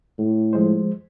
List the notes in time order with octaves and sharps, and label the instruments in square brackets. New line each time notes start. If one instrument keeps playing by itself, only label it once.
[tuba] A2
[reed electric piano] F3 G#3 C5